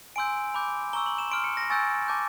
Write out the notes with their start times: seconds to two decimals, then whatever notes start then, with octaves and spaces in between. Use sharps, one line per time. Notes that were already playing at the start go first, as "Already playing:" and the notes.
0.16 G#5 C6 E6 G6 D7
0.54 B5 D6 G6
0.93 A#5 C#6 E6 G7
1.06 F#7
1.18 E7
1.31 C6 F6 D7
1.44 C#7
1.57 A#6
1.70 G#5 C#6 E6 G6 A6
2.08 A5 D6 G6